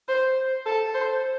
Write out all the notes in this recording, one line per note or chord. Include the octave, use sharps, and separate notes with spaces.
C5
A4
C5